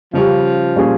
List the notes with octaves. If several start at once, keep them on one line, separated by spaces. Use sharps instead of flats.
C#3 F3 G3 C#4 G4
A#2 G3 C#4 G#4